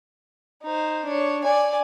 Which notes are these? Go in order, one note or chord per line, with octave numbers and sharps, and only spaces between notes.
D#4 C5
D4 C#5
D5 G#5